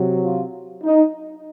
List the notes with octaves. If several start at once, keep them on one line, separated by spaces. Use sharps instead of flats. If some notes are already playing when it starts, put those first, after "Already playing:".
Already playing: C3 F#3
F4
D#4